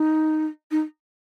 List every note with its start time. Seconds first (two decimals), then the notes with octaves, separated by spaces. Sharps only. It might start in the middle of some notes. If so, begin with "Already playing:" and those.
Already playing: D#4
0.71 D#4